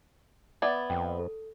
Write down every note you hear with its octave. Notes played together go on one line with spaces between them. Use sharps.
B3 D5 E5 G#6 A6
F2 G5
A4